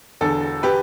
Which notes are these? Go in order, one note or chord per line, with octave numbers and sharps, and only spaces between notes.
E1 E2 D3 A4
G4 B4